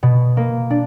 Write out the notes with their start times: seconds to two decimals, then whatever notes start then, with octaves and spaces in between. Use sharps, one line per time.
0.03 B2
0.37 A#3
0.70 D4